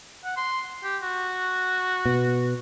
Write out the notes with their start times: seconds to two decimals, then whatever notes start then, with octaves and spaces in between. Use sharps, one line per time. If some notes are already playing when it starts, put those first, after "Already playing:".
0.24 F#5
0.37 C6
0.83 G4
1.02 F#4
2.06 B2